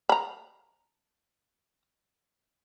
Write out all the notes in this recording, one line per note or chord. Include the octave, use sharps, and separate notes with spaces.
A#5 B5